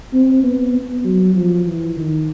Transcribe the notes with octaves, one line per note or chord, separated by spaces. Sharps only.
C4
B3
B3
F#3
F3
E3
D#3